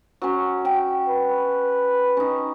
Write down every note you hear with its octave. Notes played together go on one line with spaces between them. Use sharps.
F#3 C#4
G5
B4
C#4 D#4